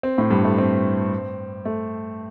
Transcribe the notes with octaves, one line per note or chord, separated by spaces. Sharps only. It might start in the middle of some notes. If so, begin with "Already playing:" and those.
C4
A2
G2
A3
C4
A3